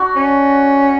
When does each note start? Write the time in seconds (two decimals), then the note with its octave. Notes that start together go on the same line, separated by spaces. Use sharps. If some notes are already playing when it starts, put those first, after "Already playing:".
Already playing: D4 F#4
0.16 C#4